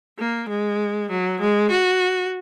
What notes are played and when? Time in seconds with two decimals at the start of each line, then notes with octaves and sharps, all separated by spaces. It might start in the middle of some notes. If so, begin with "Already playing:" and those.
0.19 A#3
0.49 G#3
1.11 F#3
1.41 G#3
1.70 F#4